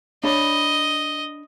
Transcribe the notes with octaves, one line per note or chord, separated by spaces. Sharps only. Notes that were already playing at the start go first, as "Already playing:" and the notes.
D4 C#5 D#5 B5